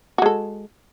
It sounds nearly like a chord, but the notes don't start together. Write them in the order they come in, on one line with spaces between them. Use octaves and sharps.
F#4 G#3 A4